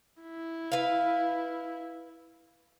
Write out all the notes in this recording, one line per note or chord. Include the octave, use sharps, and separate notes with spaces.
E4
B4 F5